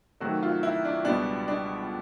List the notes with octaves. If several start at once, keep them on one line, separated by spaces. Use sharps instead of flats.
C3 D#3 F#3 A3 F#4
F4
E4
D4
C#2 B2 G3 B3 D4
D4